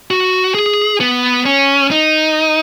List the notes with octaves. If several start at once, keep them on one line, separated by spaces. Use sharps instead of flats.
F#4
G#4
B3
C#4
D#4